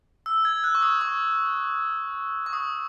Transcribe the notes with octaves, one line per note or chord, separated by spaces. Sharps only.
E6
G#6
F#6
C#6
D#6
C#6
C#6
D#6